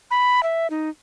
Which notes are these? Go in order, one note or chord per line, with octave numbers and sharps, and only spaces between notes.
B5
E5
D#4